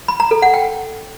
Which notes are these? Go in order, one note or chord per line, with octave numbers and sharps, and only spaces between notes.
B5
A#5
A4
F#5
G5